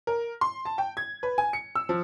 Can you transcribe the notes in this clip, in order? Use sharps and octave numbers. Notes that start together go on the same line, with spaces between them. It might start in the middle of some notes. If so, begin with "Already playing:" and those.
A#4
C6
A5
G5
G#6
B4
G#5
C#7
E6
F3